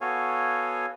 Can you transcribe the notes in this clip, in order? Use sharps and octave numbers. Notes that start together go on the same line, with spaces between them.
B3 F#4 A4 C#5 F5 G#5